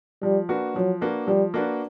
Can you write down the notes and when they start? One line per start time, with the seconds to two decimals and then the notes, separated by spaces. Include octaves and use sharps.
0.22 F3 G3
0.49 A#3 D4 F#4 B4
0.76 F3 F#3
1.01 A#3 D4 F#4 B4
1.27 F3 G3
1.54 A#3 D4 F#4 B4